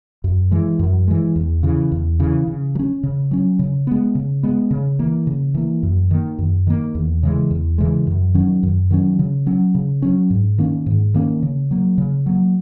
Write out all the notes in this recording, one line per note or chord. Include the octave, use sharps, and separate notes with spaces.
F#2
E3 G#3
F#2
E3 G#3
E2
C#3 E3
E2
C#3 E3
C#3
F#3
C#4
C#3
F#3 C#4
C#3
G#3 B3
C#3
G#3 B3
C#3
E3 A#3
C#3
E3 A#3
F#2
D#3 A#3
F#2
D#3 A#3
E2
C#3 E3 G#3
E2
C#3 E3 G#3
F#2
D#3 F#3 C#4
F#2
D#3 F#3 C#4
C#3
F#3 C#4
C#3
F#3 C#4
G#2
D#3 A#3 C#4
G#2
D#3 A#3 C#4
C#3
F#3 A#3
C#3
F#3 A#3